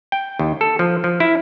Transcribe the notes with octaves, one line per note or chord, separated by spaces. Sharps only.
G5
D#2
A4
F3
F3
E4